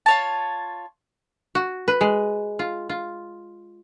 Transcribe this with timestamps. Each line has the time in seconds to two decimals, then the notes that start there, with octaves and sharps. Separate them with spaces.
0.06 F4 C#5 A5
1.55 F#4
1.88 B4
2.01 G#3
2.59 F4
2.89 F4